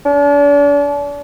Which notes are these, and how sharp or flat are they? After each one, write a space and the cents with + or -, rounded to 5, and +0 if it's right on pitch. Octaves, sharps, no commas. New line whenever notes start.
D4 -40